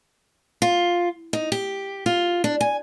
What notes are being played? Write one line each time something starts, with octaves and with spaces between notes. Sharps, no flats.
F4
D#4
G4
F4
D4
G#5